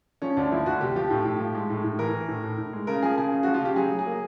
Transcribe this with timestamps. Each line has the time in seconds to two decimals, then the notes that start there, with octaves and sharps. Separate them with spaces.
0.22 F3 C#4
0.37 D2 D4
0.52 F3 E4
0.66 D2 F#4
0.81 C3 G4
0.96 F3 G4
1.10 A2
1.25 A2
1.40 F3
1.55 G#3
1.70 A2
1.84 A2
1.99 E3 A#4
2.14 E3
2.28 A2
2.44 A2
2.58 A2
2.73 G#3
2.87 C#3 A#4
3.02 F3 G#4
3.17 C#3 G#4
3.32 C#3
3.43 F3 F#4
3.54 F4
3.62 C#3 G4
3.76 F#3 G#4
3.92 F#3
3.99 G#4
4.06 A#3